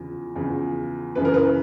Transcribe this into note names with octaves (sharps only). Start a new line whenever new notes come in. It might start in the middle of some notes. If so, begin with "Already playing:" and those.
Already playing: E2 C#3 F3
E2 C#3 F3
F#2 C#3 E3 B4
A#4
B4